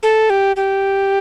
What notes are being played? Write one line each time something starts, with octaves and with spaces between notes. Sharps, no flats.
A4
G4
G4